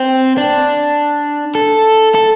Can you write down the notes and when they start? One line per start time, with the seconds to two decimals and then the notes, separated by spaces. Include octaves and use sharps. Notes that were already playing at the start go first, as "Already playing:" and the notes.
Already playing: C4
0.38 D4
1.55 A4
2.15 A4